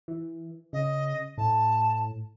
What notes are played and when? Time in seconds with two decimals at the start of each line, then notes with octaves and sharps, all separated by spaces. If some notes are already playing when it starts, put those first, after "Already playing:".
0.08 E3
0.73 C#3 D#5
1.38 A2 A5